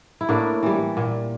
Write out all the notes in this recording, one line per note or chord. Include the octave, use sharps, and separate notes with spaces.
E4
A2 A#3 D4
E3 G3
A#2